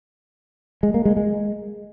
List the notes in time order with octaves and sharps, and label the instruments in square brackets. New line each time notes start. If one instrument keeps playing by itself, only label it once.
[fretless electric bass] G#3
A#3
G#3
G#3